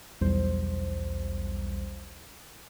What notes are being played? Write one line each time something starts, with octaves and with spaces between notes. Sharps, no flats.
B1 E2 G3 C5